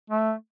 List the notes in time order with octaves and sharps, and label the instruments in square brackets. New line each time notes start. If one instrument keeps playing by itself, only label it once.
[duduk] A3